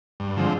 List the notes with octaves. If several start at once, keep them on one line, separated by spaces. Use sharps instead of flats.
G2
D3 F3 G#3 C4